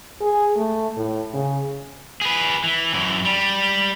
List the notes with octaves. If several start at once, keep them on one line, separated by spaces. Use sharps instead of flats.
G#4
A3
A2
C#3
G#4 B4
E3
F#2 E3
G3